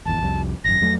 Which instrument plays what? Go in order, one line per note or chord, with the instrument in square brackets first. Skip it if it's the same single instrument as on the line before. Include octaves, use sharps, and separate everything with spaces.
[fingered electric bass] D#1 G#1 E2 [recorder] A5
[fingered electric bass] C2 F2 G3
[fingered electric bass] G#1 F#2 [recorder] A#6
[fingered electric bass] F2 F#3 A3